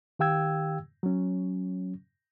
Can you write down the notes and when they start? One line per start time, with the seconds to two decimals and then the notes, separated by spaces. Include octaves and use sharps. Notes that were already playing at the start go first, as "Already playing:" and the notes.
0.19 D#3 G4 F5 G5 E6 G#6
1.03 F#3 C#4